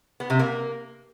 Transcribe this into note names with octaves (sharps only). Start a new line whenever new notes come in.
B3
C3
A#3